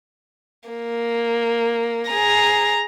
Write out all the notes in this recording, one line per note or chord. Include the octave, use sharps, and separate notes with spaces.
A#3
G#4 A#5